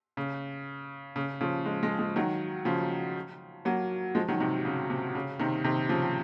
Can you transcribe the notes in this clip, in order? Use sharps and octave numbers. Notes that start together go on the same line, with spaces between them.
C#3
C#3
C#3 F3
F3 G#3
F3 G#3
F3 G#3
D#3 F#3
C#3 F3
F#3 A#3
F3 G#3
D#3 F#3
C3 D#3
C#3
C3
C#3
C3 D#3
C3 D#3
C#3 F3